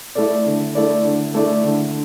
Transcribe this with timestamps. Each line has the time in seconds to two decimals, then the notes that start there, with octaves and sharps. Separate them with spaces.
0.15 A3 E4 A4 D5
0.46 D3
0.75 A3 E4 A4 D5
1.05 D3
1.34 A3 E4 A4 D5
1.64 D3